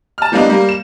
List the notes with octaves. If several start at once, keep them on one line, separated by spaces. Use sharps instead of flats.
A5 F6
E3 G3 A#3 B3 D4 D#4
G3 A#3
E7